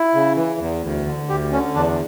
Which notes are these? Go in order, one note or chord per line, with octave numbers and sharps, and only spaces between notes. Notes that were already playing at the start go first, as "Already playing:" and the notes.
Already playing: E4
C#3
E3
E2
D2
D3
D2 G4
D3 C#4
E2 D4